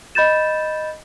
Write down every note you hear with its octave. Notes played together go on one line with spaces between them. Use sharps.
D#5 B5 G6 A6 E7